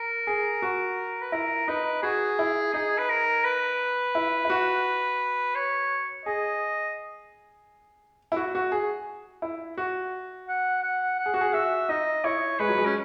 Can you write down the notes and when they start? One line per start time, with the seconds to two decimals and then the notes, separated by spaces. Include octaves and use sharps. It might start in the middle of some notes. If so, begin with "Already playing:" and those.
Already playing: A#4
0.27 G#4
0.62 F#4
1.21 B4
1.32 E4 A#4
1.68 D#4 B4
2.03 F#4 G#4
2.39 E4
2.74 D#4 G#4
2.98 B4
3.09 A#4
3.44 B4
4.15 E4
4.45 E4
4.50 F#4
5.55 C#5
6.25 G#4 D#5
8.32 E4
8.36 F#4
8.55 F#4
8.72 G#4
9.42 E4
9.78 F#4
10.48 F#5
10.83 F#5
11.19 F#5
11.26 G#4
11.34 F#4
11.41 G#4
11.54 F#4 E5
11.89 D#4 D#5
12.24 E4 C#5
12.59 G#3 B4
12.69 F#3
12.78 G#3
12.85 C#4